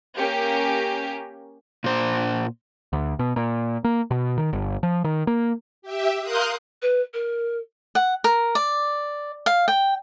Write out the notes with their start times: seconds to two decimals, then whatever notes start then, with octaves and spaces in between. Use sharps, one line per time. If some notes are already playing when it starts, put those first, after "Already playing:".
0.18 A#3 C#4 G4 A#4
1.84 A#2 C5
2.93 D2
3.19 B2
3.36 A#2
3.84 A#3
4.11 B2
4.38 D#3
4.53 G1
4.83 F3
5.04 D#3
5.27 A#3
5.82 G4 E5
6.21 A#4 F5 C6 D#6 F#6 G6
6.82 B4
7.14 A#4
7.95 F#5
8.24 A#4
8.55 D5
9.46 F5
9.68 G5